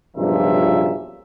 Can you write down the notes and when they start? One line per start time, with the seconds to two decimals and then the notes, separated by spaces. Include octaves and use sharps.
0.16 B1 G2 A#2 C#3 F3 E5